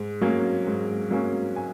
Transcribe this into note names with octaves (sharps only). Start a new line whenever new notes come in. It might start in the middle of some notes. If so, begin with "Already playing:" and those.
Already playing: G#2
F#3 A#3 C#4
G#2
F#3 A#3 C#4
G#5